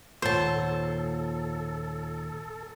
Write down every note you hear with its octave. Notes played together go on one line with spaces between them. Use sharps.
D#2 A#2 F4 A4 C5 C#5 F#5 A5